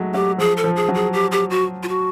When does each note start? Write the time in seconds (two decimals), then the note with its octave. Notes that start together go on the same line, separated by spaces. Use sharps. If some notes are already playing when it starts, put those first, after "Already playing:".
Already playing: F#3 G#3 A3
0.14 F#3 G4
0.38 F3 G#4
0.57 A4
0.64 F3
0.76 G#4
0.89 F#3
0.95 G#4
1.13 G4
1.32 G4
1.50 F#4
1.83 F4
1.89 F#4